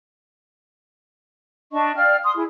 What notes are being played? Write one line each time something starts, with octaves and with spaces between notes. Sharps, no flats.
D4 D#5 A5 C#6
D5 F5 G5 F6
C6 D#6
E4 G#4